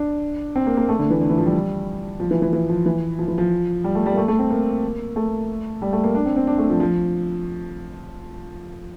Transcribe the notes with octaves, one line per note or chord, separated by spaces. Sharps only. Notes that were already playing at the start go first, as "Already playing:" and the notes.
Already playing: D4
C4
A#3
A#3
A3
D3
E3
D3
E3
F3
G3
F3
E3
E3
E3
F3
E3
F3
E3
F3
G3
A3
G3
A#3
A3
A3
C4
A#3
A3
G3
A3
A#3
D4
C4
C4
D4
A3
F3
F3